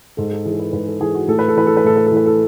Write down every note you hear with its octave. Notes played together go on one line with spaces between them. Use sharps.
G#2 A4
A4
E3 G#4
A4
B4
G#2 B4
A4
E3 G#4
F#4
A2 A4
B4
A4
E3 B4
A4
B4
A2 A4
B4
A4
E3 B4
A4